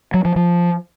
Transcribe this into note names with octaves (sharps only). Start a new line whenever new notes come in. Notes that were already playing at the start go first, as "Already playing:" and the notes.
F#3
F3
F3